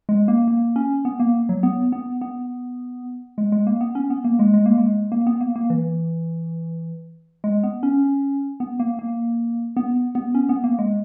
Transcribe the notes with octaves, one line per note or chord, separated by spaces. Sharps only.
G#3
A#3
A#3
C#4
B3
A#3
F#3
B3
B3
B3
G#3
G#3
A#3
B3
C#4
B3
A#3
G#3
G#3
A#3
G#3
A#3
B3
A#3
A#3
E3
G#3
B3
C#4
B3
A#3
A#3
B3
B3
C#4
B3
A#3
G#3